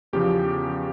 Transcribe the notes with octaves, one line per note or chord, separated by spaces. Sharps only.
E2 C#3 F3 G4